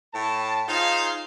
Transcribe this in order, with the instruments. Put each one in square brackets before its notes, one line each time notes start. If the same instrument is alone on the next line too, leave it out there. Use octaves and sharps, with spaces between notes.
[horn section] A2 A5
D#4 F4 G#4 C5 F5